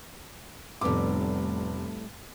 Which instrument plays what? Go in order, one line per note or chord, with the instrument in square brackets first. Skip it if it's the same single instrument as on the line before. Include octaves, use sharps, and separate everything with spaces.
[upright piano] F1 B3 D6 [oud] A2 G3